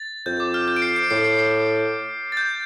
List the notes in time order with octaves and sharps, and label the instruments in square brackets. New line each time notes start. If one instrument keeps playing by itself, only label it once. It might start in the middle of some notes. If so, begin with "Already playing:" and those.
Already playing: [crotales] A6
[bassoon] F2 [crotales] G6
[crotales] D6
F6
G6
D7
C7
D7
[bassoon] A2 [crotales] C7
[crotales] C7
C7
A6
G6